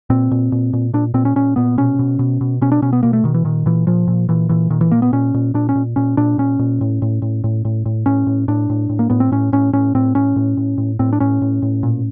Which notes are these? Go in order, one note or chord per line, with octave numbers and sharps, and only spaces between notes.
A#2 C4
A#2
A#2
A#2
A#2 D4
A#2 C4
C#4
A#2 C#4
A#2 B3
B2 C#4
B2
B2
B2
B2 C#4
D4
B2 C#4
B3
B2 A#3
A3
B2 D#3
E3
A#2 D#3
A#2 E3
A#2 F3
A#2
A#2 E3
A#2 E3
A#2 D#3
E3
A#2 A#3
B3
A#2 C#4
A#2
A#2 D4
C#4
A#2
A#2 C#4
A#2 D4
A#2 C#4
A#2
A2
A2
A2
A2
A2
A2
A2 C#4
A2
A2 D4
A2
A2
A#3
A2 B3
C4
A2 C#4
A2 C#4
A2 C#4
A2 C4
A2 C#4
A2
A2
A2
A2 C4
D4
A2 C#4
A2
A2
A#2